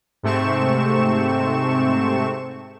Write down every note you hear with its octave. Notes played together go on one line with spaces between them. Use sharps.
G#2 C3 A3 C4 C#6 E7